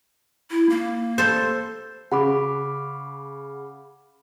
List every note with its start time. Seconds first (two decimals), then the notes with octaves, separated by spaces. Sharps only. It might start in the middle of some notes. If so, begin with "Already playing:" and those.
0.51 E4
0.70 A#3
1.18 A4 C5
2.12 C#3 F#5 B5 D6